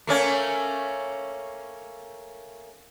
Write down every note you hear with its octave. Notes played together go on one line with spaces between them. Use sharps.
A3 A#3 C#4